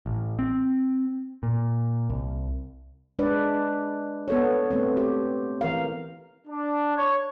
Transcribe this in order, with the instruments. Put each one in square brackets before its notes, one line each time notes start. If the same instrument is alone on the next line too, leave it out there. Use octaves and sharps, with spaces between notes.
[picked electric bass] A1
C4
A#2
C2
[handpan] G#3 D4 B4 D5
B3 A4 C#5
A3 B3 C4
G4
E3 A#4 F5
[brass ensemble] D4
C#5